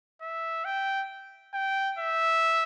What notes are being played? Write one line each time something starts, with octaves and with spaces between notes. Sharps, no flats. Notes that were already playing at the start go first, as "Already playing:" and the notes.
E5
G5
G5
E5